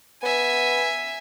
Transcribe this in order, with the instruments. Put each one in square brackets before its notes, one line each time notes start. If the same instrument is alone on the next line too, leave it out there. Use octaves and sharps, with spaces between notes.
[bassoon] B3 [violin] E5 G#5